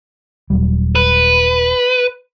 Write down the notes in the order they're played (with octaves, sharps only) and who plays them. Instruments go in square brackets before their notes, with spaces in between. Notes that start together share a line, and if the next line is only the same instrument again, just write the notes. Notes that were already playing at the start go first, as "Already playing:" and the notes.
[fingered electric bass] D#1 F#3 G3
[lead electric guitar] B4